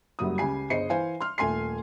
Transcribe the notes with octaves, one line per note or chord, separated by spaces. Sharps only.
F#1 F#3 G3 D#6
C#2 C#3 G4 G#5 C7
G1 G#4 C5 D#5 C7 C#7
E3 C5 F5 G#5
C6 F6
D#1 A3 G#5 C6 C7